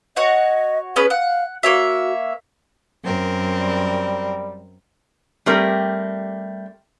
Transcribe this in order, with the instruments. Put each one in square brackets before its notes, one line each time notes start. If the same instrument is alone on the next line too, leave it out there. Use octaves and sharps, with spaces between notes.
[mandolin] F#4 C#5 F#5 [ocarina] D#5
[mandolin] B3 C#4 B4 [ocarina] G#4
[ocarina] F5 [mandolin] F#5
[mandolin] A#3 C#5 E5 [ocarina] F#4
[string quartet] F#2 C4 A#4
[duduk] G3
[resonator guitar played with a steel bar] G3 A3 C4 G4 A#4